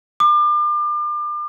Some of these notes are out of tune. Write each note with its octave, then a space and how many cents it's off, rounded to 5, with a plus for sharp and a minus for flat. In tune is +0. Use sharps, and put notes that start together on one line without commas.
D6 +35